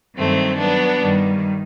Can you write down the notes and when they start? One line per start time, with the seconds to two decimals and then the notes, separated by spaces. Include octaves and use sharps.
0.16 G2 D#3 F#3 A3 C4
0.58 F#3 B3 D4
1.01 G2 D#3 G3